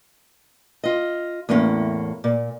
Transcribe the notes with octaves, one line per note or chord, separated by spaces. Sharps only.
F4 D#5
E2 A2 A#3 C#4
A#2